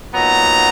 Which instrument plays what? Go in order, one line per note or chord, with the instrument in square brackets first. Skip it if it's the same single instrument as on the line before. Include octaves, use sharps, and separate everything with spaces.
[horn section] A#2 F#3 B3 D#4 A#5